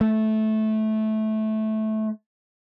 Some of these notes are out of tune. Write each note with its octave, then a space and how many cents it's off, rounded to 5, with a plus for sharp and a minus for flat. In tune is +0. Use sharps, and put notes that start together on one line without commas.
A3 -15